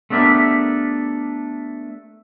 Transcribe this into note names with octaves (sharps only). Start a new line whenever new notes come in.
A3 B3 D4 G4 A#4 E5